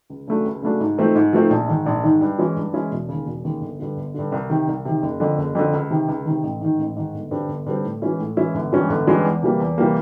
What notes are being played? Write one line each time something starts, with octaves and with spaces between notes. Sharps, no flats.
C#2
C#3 F#3 A3 D4
C#2
C#3 F#3 A3 D4
G#2
F3 A3 C4 D#4
G#2
F3 A3 C4 D#4
A#1
G#2 D#3
A#1
G#2 D#3
G2
E3 G#3 C#4 E4
G2
E3 G#3 C#4 E4
E1
D#2 C#3
E1
D#2 C#3
G1
G2 D3
G1
G2 D3
C2
C3 D#3
C2
C3 D#3
F#1
F2 D3
F#1
F2 D3
C#2
C3 D#3
C#2
D#3
C3
A1
G#2 D#3
A1
G#2 D#3
G1
G2 D3 G3 C4
G1
G2 D3 G3 C4
A2
E3 G#3 C#4 E4
A2
E3 G#3 C#4 E4
G1
G2 E3 G#3 C#4
G1
G2 E3 G#3 C#4
E2
C3 E3 G3 A#3
E2
C3 E3 G3 A#3